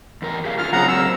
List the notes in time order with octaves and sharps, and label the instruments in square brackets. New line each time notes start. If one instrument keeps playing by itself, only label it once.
[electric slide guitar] E2 A#4
G4 G#4 F5
[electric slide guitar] D3 F4 G#4 [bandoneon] F6
[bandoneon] C#3 F#5 A#5 [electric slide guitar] F#3 A#3 C4
[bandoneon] E6